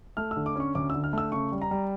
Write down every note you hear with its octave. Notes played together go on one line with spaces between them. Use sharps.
A3 F6
E6
D3
D6
C#4 C#6
D2 D6
D3 E6
F6
A3 E6
C#3 C#6
G3
A#5
G3